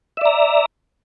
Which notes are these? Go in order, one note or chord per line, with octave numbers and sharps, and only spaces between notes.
D5 E5 A#5